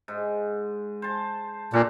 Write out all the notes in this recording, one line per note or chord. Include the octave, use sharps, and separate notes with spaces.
G#2
C5 A5
A#2 D4 A4 F#5